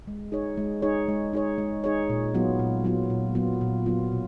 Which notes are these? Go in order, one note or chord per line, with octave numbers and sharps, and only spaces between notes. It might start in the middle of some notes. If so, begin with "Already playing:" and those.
G#3
D#4 G#4 C#5
G#3
D#4 G#4 C#5
G#3
D#4 G#4 C#5
G#3
D#4 G#4 C#5
A#2
F#3 B3 F4
A#2
F#3 B3 F4
A#2
F#3 B3 F4
A#2
F#3 B3 F4
B2